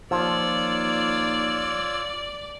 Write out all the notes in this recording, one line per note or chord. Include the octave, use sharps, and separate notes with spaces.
D#2 F3 F4 C#5 D5 E6